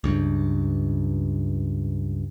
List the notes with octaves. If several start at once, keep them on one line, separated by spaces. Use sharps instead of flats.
C#2 G2